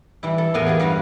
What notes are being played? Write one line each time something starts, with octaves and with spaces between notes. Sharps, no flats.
E3 G3 E4
A4
E2 A2 B3 A#4 F5 G#5
F4 G4 G#4
G2 G3 F#4 F5